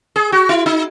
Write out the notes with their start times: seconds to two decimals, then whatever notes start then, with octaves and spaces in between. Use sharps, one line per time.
0.16 G#4
0.32 F#4
0.49 E4
0.66 D#4